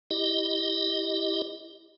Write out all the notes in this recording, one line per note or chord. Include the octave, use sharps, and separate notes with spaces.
E4 G4 D#5